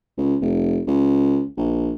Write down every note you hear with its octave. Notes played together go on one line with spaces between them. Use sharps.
C#2
F1
C#2
A#1